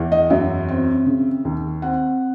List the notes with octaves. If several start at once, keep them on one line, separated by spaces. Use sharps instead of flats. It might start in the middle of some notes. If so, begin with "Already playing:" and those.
Already playing: E2 E3
D#5
F#2 E5
C4
C#3
D#2
C4 F#5